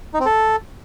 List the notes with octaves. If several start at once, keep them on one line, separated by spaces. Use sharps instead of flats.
D#4
C4
A4